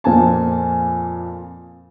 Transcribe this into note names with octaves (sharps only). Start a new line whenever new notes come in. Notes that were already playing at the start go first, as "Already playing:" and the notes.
F2 A#2 A#3 G#5 A5